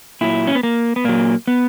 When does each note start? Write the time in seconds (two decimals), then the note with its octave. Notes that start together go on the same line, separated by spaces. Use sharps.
0.21 A#2 F#3 E4
0.47 C#4
0.55 B3
0.63 A#3
0.96 B3
1.04 A#2 F#3 A#3
1.47 B3